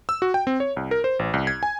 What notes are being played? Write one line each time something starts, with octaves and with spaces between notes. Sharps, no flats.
E6
F#4
G5
C4
C#5
C2
A#4
C5
A1
C2
G#6
G#5